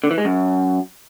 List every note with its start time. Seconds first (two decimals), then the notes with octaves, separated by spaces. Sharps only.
0.04 D3
0.11 E3
0.18 G#3
0.25 F#2